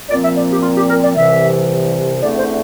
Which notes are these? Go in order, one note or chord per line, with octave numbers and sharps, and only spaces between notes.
A#2 F3 C4 D5
E5
D5
G4
F4
G4
A#4
D5
C2 C3 E3 E5
E2 D3 A3 C4 D5
C5